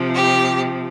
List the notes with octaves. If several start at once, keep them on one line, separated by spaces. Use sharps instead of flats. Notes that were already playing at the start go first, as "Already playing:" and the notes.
Already playing: C3 F3
G4